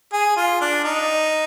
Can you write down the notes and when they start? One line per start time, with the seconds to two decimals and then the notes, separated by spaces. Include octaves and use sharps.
0.13 G#4
0.36 F4
0.61 D4
0.84 D#4